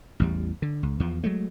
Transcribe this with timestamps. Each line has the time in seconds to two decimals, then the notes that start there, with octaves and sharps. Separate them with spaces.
0.20 A1 E2 G3
0.62 D3
0.83 C#2
1.00 E2 F3
1.24 F#3 G#3 A3